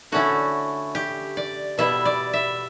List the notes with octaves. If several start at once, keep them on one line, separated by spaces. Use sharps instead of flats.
D3 A3 C#4 E4 F#4
G4
D5
B2 G3 B3 E4 E5
D5
E5